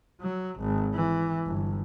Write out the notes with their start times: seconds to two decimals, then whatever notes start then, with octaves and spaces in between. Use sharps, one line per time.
0.21 F#3
0.59 G#1
0.94 E3
1.46 G1